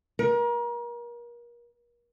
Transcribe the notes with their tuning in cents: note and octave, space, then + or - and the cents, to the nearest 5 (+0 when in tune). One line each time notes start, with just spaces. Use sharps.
A#4 +35